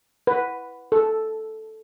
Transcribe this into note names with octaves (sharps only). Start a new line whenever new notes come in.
B4
A4